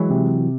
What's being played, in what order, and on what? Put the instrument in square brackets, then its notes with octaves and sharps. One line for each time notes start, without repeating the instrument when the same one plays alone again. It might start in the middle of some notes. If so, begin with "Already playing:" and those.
Already playing: [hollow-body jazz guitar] E3 F#3 [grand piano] G#3
[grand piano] C3